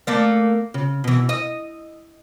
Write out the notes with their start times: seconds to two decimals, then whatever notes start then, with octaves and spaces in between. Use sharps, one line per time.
0.07 A3 A#3 D5
0.74 C#3
1.04 B2 E3
1.29 D#5